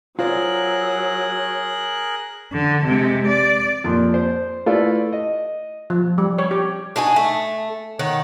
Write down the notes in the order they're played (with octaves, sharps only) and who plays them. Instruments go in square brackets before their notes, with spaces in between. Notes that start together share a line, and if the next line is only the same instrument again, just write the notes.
[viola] F#3 [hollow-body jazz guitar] F4 C5 D5 [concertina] G#4 A#4 F#6
[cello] D3
C3 G#3
D5
[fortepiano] F2 A#2 C6
C5
A3 E4 F4 A4 B4 D5
D#5
[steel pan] F3
G3
C#5
G4
[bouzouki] D4 D#4 F#4 G#5
A3
D#3 C#5 F#5